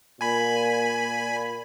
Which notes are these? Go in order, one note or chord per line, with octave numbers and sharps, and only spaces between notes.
A#2 G#5 B5